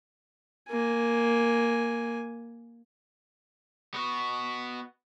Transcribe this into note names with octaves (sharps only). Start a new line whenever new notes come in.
A#3 G#5
B3 F#4